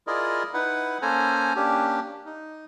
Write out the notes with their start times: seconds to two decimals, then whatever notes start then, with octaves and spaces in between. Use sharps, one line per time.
0.07 E4 F4 G#4 A#4 D5 D#5
0.54 D#4 E4 B4 F#5
1.02 A#3 C#4 A4 C5 G#5 A#5
1.56 A#3 C#4 D4 G4
2.26 D#4